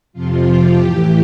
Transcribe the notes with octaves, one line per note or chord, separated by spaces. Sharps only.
F2 C3 F3 F4
G4
A2 E3